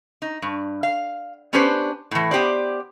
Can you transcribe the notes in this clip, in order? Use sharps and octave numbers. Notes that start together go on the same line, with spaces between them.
D#4
G2
F5
B3 C#4 D4 G4 B4 C5
A2 E3
B3 G4 C5 D5